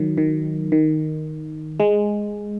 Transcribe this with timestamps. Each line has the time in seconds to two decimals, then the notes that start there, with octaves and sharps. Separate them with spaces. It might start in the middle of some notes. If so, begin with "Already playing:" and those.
Already playing: D#3 F#3
0.18 D#3
0.72 D#3
1.80 G#3